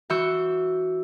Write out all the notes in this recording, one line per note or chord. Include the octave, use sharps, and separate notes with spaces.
E3 E4 F#4 C#6 E6 G6